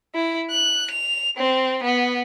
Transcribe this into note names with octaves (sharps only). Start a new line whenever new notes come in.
E4
F#6
F7
C4
B3